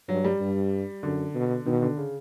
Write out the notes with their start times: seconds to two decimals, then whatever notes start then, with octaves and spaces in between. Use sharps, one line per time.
0.09 G2 F#3
0.24 G3
0.40 G2
1.03 F#2 D3
1.35 B2
1.66 B2 D#3
1.82 D3
1.97 C#3